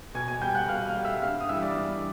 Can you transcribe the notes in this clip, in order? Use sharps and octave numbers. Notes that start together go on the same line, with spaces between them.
B2 G#5 G#6
G#5 G#6
G3 G5 G6
F#5 F#6
B2 F5 F6
F5 F6
G3
E5 E6
G2 F5 F6
D#6
E3 G3 E5 E6
D5 D6
G2